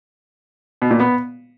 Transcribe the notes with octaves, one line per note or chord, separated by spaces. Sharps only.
B2
A#2
B3